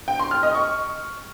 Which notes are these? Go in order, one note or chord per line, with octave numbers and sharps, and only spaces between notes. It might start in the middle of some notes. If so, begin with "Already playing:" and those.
G5
C6
F6
D#5
C#6